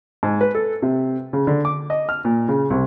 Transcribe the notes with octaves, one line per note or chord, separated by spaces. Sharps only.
G#2
B4
A4
C3
C#3
D3
D6
D#5
F6
A#2
C#3
C2